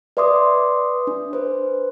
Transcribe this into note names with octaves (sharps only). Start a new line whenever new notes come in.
B4 D5 E5 C6 D6 D#6
D4
B4 C5